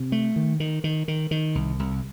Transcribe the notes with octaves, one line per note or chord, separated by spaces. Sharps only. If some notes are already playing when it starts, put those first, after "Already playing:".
Already playing: C3
A3
D#3
D#3
D#3
D#3
D#3
C2
C2